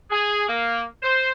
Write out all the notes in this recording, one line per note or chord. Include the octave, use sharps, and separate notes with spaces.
G#4
A#3
C5